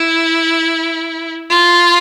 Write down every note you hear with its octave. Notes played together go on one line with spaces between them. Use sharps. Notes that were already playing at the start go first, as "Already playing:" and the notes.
Already playing: E4
F4